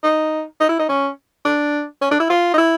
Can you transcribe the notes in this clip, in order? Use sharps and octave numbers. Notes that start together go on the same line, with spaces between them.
D#4
D#4
E4
D#4
C#4
D4
C#4
D4
E4
F4
D#4
E4